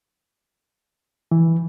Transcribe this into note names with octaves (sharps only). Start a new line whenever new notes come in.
E3